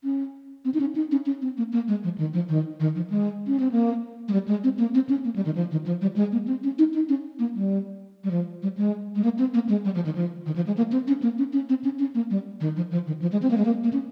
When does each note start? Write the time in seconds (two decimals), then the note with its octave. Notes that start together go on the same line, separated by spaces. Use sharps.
0.04 C#4
0.65 C4
0.74 D#4
0.80 C#4
0.95 D#4
1.11 C#4
1.26 C#4
1.42 C4
1.57 A#3
1.73 A#3
1.88 G#3
2.04 F3
2.18 D#3
2.33 F3
2.49 D#3
2.80 D#3
2.95 F3
3.10 G#3
3.47 C#4
3.60 C4
3.72 A#3
4.28 G#3
4.33 G3
4.48 G#3
4.64 C4
4.78 A#3
4.95 C4
5.09 C#4
5.24 A#3
5.36 G3
5.45 D#3
5.56 F3
5.71 D#3
5.86 F3
6.01 G3
6.16 G#3
6.32 A#3
6.47 C4
6.63 C#4
6.79 D#4
6.94 D#4
7.09 C#4
7.39 A#3
7.55 G3
8.24 G3
8.31 F3
8.62 G3
8.77 G#3
9.16 G#3
9.24 A#3
9.39 C4
9.54 A#3
9.69 G#3
9.85 G3
9.95 F3
10.05 D#3
10.15 F3
10.46 D#3
10.56 F3
10.67 G#3
10.77 A#3
10.92 C4
11.08 C#4
11.22 A#3
11.38 C#4
11.53 C#4
11.69 C4
11.84 C#4
11.99 C#4
12.15 A#3
12.30 G3
12.61 D#3
12.76 F3
12.91 F3
13.07 D#3
13.22 F3
13.32 G#3
13.42 C4
13.51 A#3
13.58 G#3
13.65 A#3
13.84 A#3
13.93 C#4